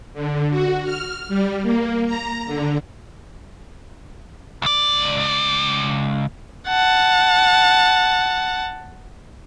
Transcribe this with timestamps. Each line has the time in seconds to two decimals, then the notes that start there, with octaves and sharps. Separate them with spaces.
0.14 D3
0.50 F#4
0.85 F6
1.28 G3
1.63 A#3
2.06 A#5
2.46 D3
4.62 C#2 D5
6.68 F#5 A5